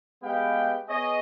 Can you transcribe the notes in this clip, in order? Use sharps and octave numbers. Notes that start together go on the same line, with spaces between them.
G#3 B3 G4 B4 F5 G5
B3 G#4 C#5 D#5